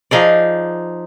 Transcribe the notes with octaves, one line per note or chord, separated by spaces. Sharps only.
F3 D#4 G#4 D5